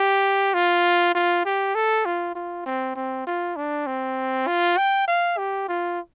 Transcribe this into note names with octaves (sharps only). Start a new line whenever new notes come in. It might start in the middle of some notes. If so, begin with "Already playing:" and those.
Already playing: G4
F4
F4
G4
A4
F4
F4
C4
C4
F4
D4
C4
F4
G5
F5
G4
F4